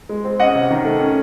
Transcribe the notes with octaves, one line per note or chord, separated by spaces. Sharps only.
G#3
C4
C#4 D#5 F#5
C3
D#3
A3
C#4